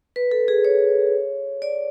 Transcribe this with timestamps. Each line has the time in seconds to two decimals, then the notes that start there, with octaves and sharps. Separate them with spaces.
0.16 B4
0.31 A4
0.48 G#4
0.65 C#5
1.62 D5